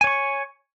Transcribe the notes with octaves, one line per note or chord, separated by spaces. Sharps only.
C#5 G#5 C#6